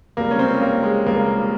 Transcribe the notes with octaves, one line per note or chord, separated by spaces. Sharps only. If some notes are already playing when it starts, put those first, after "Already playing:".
C#2 C3 G3 A#3
C#4
C4
A#3
G#3
C#2 C3 G3 A#3